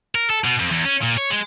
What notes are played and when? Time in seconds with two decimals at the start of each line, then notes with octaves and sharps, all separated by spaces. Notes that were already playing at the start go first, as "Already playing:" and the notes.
0.15 A#4
0.30 A4
0.44 B2
0.60 F2
0.72 E2
0.85 C#4
1.03 A#2
1.18 C#5
1.31 G#3